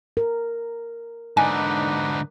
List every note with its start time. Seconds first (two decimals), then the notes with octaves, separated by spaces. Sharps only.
0.17 A#4
1.37 G#2 D3 D4 D#4 B4 G#5